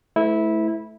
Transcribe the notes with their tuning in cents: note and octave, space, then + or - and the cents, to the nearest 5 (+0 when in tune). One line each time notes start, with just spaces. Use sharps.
A3 -15 E4 -15 B4 +40